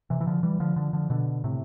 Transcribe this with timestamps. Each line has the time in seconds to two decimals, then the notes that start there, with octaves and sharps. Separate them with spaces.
0.10 C3 E3
0.20 E3
0.27 D3 F3
0.43 E3 G3
0.60 D3 F3
0.76 D3 F3
0.93 D3 F3
1.10 B2 D3
1.44 A2 C3